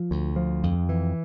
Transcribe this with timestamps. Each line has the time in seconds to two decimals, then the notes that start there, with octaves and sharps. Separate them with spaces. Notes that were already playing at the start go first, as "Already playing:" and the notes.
Already playing: F3
0.11 D2
0.36 F3
0.63 F2
0.89 E3